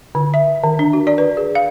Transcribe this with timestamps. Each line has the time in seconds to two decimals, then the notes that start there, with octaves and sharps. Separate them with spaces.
0.15 D3
0.34 E5
0.64 D#3
0.79 D4
0.93 F#4
1.07 D5
1.18 B4
1.37 G#4
1.55 F5